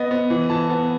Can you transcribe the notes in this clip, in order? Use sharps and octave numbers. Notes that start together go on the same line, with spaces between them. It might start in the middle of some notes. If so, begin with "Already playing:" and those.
Already playing: B3 D#5
B3
E3
E3 A5
B3